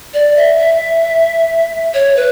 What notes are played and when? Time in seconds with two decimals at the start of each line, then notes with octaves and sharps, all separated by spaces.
0.14 D5
0.36 E5
0.59 E5
1.94 C#5
2.16 B4